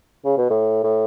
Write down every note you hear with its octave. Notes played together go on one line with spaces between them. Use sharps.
C#3
B2
A2
A2